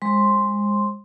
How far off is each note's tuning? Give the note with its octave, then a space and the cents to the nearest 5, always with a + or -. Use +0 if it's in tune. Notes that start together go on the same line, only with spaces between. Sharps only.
G#3 -25 C5 +35 C6 +0